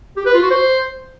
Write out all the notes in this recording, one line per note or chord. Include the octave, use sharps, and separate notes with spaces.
G4
B4
F4
F#4
C5